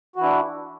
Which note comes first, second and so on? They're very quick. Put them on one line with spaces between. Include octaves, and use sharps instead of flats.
F#4 E3 E4 D4